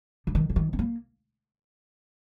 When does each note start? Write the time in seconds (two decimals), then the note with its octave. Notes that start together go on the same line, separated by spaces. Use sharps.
0.27 D3
0.35 D#3
0.50 D3
0.56 D#3
0.73 C4
0.79 A#3